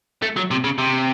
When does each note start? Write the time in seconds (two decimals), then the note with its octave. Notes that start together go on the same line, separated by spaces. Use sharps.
0.22 A3
0.36 F#3
0.51 C3
0.64 C#3
0.78 C3